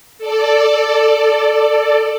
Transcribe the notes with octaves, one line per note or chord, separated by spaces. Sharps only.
A4 D5